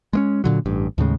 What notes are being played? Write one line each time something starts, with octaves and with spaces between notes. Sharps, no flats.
G#3 A#3 C#4
A#2 D3 F#3
A1 G2
D#2 A2 C#3 G#3